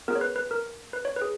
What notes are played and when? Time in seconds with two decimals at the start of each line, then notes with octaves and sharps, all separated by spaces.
0.08 B3 F4 G#4 A#4
0.15 C#5
0.21 B4
0.36 B4
0.51 A#4
0.93 B4
1.05 C#5
1.16 B4
1.22 G#4